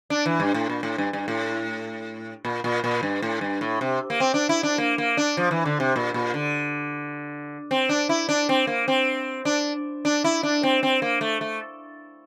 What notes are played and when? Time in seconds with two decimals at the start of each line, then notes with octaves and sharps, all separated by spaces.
0.10 D4
0.26 E3
0.40 G2
0.54 A2
0.70 A#2
0.83 A2
0.98 G2
1.13 G2
1.28 A2
2.45 A#2
2.64 A#2
2.84 A#2
3.03 G2
3.22 A2
3.41 G2
3.61 A2
3.81 C3
4.10 A#3
4.20 C4
4.34 D4
4.49 E4
4.63 D4
4.78 A#3
4.98 A#3
5.17 D4
5.37 F3
5.51 E3
5.66 D3
5.80 C3
5.96 A#2
6.14 A#2
6.34 D3
7.71 C4
7.89 D4
8.09 E4
8.29 D4
8.49 C4
8.67 A#3
8.88 C4
9.45 D4
10.05 D4
10.24 E4
10.43 D4
10.63 C4
10.83 C4
11.02 A#3
11.21 A3
11.41 A3